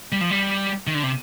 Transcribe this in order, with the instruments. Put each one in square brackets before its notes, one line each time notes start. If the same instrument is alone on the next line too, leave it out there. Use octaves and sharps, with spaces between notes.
[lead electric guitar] G3
F3
G3
D#3
D3
C3